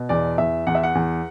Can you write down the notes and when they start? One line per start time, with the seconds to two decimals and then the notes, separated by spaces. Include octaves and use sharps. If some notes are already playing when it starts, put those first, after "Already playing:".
Already playing: B2
0.09 E2 D5
0.38 E2 E5
0.67 E2 F#5
0.75 E5
0.83 F#5
0.95 E2